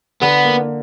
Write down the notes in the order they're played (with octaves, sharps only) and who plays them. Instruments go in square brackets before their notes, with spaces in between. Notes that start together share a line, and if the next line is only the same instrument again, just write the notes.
[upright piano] D3 [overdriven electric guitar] B3
[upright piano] A#3